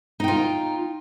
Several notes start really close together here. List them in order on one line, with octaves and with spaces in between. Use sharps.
D#4 G5 F4